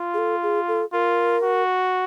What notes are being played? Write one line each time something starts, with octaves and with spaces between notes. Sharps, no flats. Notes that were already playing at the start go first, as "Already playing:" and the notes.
Already playing: F4
G#4
A4
G#4
A4
F4 A#4
F#4